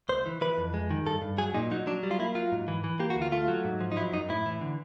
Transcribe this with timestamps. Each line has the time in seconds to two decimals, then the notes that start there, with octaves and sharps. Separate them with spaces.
0.09 C#2 C5
0.26 E3
0.41 E3 B4
0.58 F2
0.74 G#3
0.91 D#3
1.06 G2 A4
1.22 G2
1.38 F#3 G#4
1.54 A#2 D#4
1.71 F#3 D#4
1.87 F#3 D4
2.03 G3
2.11 F4
2.19 A#3 E4
2.35 F#3 F4
2.52 G#2
2.68 E3
2.84 E3
2.99 A#3 G4
3.10 F#4
3.16 D2
3.22 F4
3.32 A3 F4
3.48 F#3
3.65 G#2
3.81 F3
3.92 D#4
3.96 F#3 E4
4.13 F#2 D#4
4.29 A2 E4
4.46 E3
4.61 D3